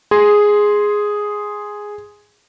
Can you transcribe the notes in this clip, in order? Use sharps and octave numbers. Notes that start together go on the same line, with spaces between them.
G#4 C6